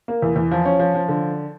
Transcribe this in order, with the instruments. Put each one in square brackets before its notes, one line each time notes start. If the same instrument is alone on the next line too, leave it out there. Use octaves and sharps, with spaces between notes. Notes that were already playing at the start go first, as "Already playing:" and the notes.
[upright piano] A#3
E2
E2
F3
C#4
F3
F3
D3